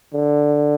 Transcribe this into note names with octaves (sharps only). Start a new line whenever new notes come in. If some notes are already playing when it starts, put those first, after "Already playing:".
D3